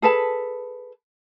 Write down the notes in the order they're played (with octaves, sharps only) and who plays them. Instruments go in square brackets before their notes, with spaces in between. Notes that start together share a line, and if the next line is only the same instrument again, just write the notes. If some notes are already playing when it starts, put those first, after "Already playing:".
[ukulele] G#4 A4 B4 A5